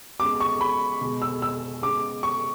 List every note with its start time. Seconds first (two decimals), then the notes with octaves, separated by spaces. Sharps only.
0.20 C#3 G#3 B3 D6
0.41 C#6
0.61 B5
1.01 B2 G#3 B3
1.22 E6
1.42 E6
1.82 C#3 G#3 B3 D6
2.23 C#6